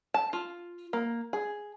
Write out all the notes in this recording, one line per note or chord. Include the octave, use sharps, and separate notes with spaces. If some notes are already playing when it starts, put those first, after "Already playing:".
A5
F4
A#3
G#4